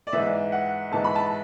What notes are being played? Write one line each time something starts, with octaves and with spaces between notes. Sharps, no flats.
D5
G#2 E3 E5
F#5
G#2 E3 A5
B5
A5